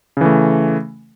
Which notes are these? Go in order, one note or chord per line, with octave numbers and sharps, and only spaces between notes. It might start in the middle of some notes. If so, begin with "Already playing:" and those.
C#3 E3 A3